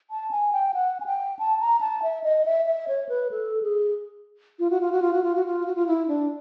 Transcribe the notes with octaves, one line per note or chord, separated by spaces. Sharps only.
A5
G#5
G5
F#5
G#5
G5
A5
A#5
A5
E5
D#5
E5
E5
C#5
B4
A4
G#4
F4
F#4
F4
F#4
F4
F#4
F4
F#4
F4
F#4
F4
E4
D4